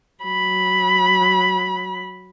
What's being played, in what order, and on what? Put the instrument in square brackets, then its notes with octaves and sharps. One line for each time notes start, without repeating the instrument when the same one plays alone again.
[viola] F#3 B5